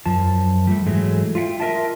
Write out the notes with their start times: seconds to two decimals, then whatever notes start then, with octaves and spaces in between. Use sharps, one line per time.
0.06 F#2 F3 A5
0.67 G3 A3
0.86 G#2 E3 F#3 G#3 A3
1.35 F4 E5 F#5 G5
1.60 F4 A#4 D#5 E5 G5 A5